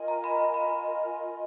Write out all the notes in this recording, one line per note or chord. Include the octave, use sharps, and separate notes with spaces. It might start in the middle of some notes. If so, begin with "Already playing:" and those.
Already playing: F4 A#4 D#5 G#5
A#5
B5
A#5
B5